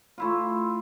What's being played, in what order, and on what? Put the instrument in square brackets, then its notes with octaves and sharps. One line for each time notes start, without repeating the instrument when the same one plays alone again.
[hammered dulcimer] A3 E4 F4